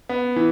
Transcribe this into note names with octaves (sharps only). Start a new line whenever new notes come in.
B3
E3